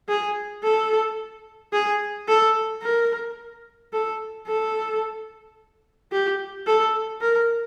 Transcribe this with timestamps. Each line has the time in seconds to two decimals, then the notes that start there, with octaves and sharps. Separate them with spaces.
0.09 G#4
0.64 A4
1.73 G#4
2.28 A4
2.83 A#4
3.93 A4
4.47 A4
6.12 G4
6.67 A4
7.21 A#4